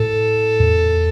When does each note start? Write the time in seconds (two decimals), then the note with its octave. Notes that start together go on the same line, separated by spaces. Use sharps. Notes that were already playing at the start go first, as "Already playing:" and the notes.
Already playing: A2 A4
0.60 E2